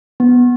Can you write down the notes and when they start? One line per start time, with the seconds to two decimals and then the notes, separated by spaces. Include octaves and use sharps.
0.20 B3